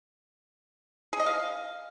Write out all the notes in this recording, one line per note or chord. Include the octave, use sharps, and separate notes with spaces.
G#4
D#5
F5